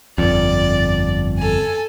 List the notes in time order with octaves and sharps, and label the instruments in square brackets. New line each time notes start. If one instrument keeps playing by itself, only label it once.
[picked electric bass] G1 F2 [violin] D5
[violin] A4 G#5